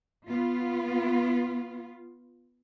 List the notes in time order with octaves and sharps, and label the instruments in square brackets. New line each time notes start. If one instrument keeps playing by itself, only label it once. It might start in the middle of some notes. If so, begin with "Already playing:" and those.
[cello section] B3 F4